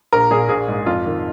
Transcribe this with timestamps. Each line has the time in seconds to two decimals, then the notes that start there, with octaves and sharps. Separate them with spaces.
0.13 A#1 A#4
0.31 A#2 G#4
0.49 A#1 G#4
0.68 G#2
0.86 F2 F4
1.06 D#3